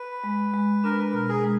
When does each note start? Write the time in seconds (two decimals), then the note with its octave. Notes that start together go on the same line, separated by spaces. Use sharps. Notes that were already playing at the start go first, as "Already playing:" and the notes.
Already playing: B4
0.24 G#3
0.54 G#3
0.84 D4 A#4
0.99 B4
1.13 B2 A#4
1.29 G#4
1.44 G#3